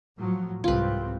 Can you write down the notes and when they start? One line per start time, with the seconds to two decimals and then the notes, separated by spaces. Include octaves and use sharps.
0.19 A2 F3 F#3
0.64 C2 G#2 C4 F4 B4